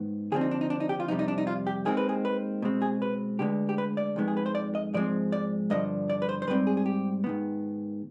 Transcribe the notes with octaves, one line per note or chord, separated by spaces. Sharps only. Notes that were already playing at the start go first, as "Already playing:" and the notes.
Already playing: G#2 D#3 B3
D#2 D3 F3 C4 G#4
D#4
D4
D#4
D4
D#4
G4
F4
F2 C3 G3 D#4
D#4
D4
D#4
F4
G4
D#2 D#3 G#3 C4 G#4
B4
G#4
B4
B2 G#3 C4
G#4
B4
D2 D3 G#3 B3 G4
G4
B4
D5
F2 D#3 G#3 B3
G#4
B4
C5
D5
D#5
G#2 F3 G#3 C4 D5
D5
G2 D3 F3 D#5
D5
B4
C5
C5
G#2 G3 C4 B4
G#4
G#4
G4
G#2 D#3 B3